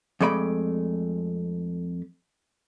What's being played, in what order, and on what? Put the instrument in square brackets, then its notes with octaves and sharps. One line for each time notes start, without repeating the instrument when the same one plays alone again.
[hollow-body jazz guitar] F2 G#3 A3 D5 B5